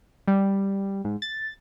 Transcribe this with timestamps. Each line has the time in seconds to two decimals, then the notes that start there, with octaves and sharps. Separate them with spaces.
0.28 G3
1.04 G#2
1.22 A6